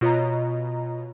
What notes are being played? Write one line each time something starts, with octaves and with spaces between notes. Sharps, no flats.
B2 F4 C#5 D#5 A#5